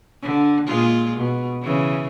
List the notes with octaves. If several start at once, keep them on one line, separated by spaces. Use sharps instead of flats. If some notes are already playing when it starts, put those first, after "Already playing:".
D3
A#2 G#3 F4
B2
C#3 E3